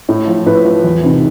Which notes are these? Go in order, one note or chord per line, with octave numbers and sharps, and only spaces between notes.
A2
F3
A2 B4
F3
E2
C3 D#3